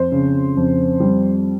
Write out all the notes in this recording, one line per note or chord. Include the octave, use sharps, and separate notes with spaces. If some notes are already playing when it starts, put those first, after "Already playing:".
Already playing: F2 C5
C#3
F2
G3